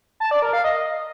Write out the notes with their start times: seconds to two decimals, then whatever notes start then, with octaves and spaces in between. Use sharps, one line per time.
0.20 A5
0.31 D5
0.42 A#4
0.53 F5
0.64 D#5